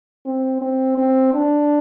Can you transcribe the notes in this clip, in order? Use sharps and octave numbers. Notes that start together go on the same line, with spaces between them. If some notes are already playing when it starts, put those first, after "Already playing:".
C4
C4
C4
D4